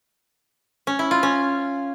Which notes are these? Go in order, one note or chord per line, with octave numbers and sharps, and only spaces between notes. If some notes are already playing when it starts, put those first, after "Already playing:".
C#4
E4
F4
C#4